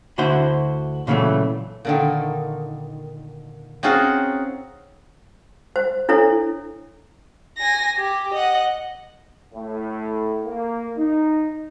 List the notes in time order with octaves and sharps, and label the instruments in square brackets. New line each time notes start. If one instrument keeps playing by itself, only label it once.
[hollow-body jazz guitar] D2 D3 E4 F#4 C5
A#2 C#3 E3 F#3 A3
[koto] A#2 D3 D#3
C4 C#4 D#4 F4 F#4 G#4
[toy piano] C5
D4 E4 A4 C#5
[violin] G#5 A#6
G4
D#5 F#5
[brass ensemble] A2
A#3
D#4